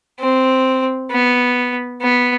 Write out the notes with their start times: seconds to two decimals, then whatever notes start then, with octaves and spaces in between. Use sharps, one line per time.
0.20 C4
1.10 B3
2.01 B3